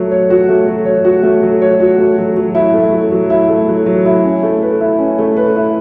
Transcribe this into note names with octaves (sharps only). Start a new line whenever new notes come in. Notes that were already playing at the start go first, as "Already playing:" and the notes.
Already playing: F#3 A3
C#5
F#4
A3
F#3
C#5
F#4
A3
F#3
C#5
F#4
A3
F#3
F#3
E4
A3
F#3
F#3
E4
A3
F#3
F#3
E4
C#4
A3
B4
E4
C#4
A3
B4
E4